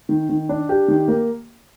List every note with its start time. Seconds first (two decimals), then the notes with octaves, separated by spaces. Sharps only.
0.09 D#3
0.29 D#3
0.49 D4
0.69 G4
0.88 D#3
1.08 A#3